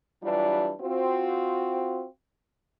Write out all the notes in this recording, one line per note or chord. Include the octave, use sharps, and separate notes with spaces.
G2 E3 F#3 G3 D4 F4
C4 F4 F#4